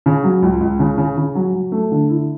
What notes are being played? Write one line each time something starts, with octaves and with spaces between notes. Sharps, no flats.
C#3
F#3
C#2
C#2
C#3
C#3
C#3
F#3
F#3
A3
D3
E4